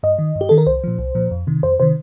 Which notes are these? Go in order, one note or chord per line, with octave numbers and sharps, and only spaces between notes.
G2 D#5
D#3
G2
G4
D#3 A4
A#4
C2 C5
A#2 F3
C2
A#2 F3
F2
C3 D#3
F2 C5
C3 D#3 C5